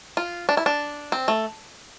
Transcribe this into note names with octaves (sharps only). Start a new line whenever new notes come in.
F4
D4
E4
D4
C4
A3